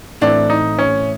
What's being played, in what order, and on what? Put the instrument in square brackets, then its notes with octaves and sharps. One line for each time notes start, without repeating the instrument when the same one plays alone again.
[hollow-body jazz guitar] A2 E3 A3 C4 E4 [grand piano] D4
[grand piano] D#4
C#4